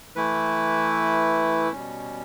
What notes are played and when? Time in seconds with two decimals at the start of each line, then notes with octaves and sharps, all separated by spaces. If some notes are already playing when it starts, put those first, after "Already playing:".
0.16 E3 A3 E4 B4
1.72 B2 G3 C#4